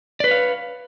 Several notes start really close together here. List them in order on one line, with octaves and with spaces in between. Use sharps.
D5 B4 C#5 F5